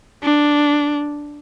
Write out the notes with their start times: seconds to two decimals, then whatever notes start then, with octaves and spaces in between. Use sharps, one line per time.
0.23 D4